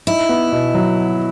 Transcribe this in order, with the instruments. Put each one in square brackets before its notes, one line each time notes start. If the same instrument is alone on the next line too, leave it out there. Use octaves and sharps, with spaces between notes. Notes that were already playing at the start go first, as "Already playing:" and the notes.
[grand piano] D#4 [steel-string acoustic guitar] E4
[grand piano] B3
B2
F#3